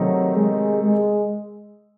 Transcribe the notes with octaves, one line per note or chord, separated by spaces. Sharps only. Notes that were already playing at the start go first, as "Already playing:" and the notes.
Already playing: C3 D#3 F#3 A3 D#4
G#3
G#3